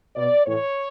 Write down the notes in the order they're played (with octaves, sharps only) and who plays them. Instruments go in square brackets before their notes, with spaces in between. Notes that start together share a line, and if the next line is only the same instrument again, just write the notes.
[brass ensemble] B2 D5
A2 E3 C#5